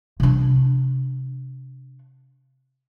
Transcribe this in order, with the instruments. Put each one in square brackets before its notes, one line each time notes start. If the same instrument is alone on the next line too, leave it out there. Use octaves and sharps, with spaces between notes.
[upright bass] C3 D4